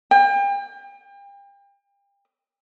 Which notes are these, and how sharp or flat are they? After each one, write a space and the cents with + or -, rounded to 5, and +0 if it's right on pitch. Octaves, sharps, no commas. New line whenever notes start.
G5 +35